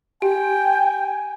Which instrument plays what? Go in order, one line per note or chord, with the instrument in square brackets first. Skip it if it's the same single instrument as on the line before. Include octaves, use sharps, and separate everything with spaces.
[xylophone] G4 [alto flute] G5 [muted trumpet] G#5